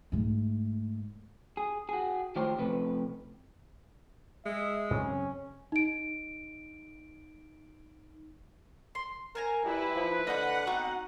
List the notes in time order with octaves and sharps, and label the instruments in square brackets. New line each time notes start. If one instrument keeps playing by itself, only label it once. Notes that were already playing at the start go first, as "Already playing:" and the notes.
[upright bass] G#2 A3
[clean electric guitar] G#4
F#4 G#4
D#3 A3 F4 G4 C5 C#5
C3 F3 A3 B4
[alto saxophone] G#3 [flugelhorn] E5
[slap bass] F#2 C#3 C4 [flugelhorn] C#4
[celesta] D#4 D7
[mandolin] C6
[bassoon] A#4 [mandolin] C5 G#5 A#5
[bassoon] G3 [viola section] E4 [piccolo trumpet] B4
[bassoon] F3
[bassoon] D3 [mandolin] D#5 G6 [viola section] F#5
[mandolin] B3 C4 D#4 [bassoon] F#4